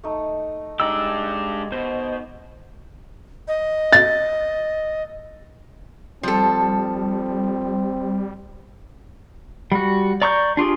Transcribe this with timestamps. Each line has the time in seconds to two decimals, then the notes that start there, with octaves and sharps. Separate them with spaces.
0.04 A3 D#4
0.80 G#3 D4 D#4 G4 D5 E6
1.72 B2 C5
3.48 D#5
3.93 A6
6.23 F3 G3 C4 A4
9.72 G3 F#4
10.22 D5 A#5 C#6 D6 G6
10.57 D4 F4 G4 G#4